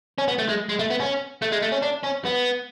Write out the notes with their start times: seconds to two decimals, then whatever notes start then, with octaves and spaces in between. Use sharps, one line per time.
0.18 C#4
0.28 B3
0.39 A3
0.49 G#3
0.69 G#3
0.79 A3
0.90 B3
1.00 C#4
1.42 A3
1.52 G#3
1.62 A3
1.72 C#4
1.82 D4
2.03 C#4
2.25 B3